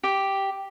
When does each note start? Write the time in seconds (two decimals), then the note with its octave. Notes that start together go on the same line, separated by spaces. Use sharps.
0.03 G4